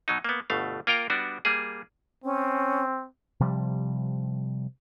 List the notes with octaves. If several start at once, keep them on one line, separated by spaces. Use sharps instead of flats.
B2 F#3 D#4
A#3 B3
G1 B2 A3 F5
A#3 F4 A#4 G5 A#5
G3 B3 D4 F#4
G3 A#3 G#4
C4 C#4
C3 F3 G3